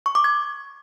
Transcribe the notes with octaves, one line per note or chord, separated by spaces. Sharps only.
C#6
D6
G#6